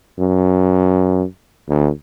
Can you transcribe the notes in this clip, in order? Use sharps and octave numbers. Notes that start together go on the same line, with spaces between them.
F#2
D2